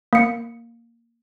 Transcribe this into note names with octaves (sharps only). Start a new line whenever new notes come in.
A#3 C#7